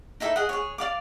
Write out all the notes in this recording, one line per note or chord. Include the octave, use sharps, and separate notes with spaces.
D#4 E4 A4 E5
G#4 D#5 F#5
G#4 C#5
D5 F5 D6